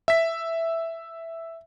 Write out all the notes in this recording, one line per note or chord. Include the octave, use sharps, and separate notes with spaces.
E5 B6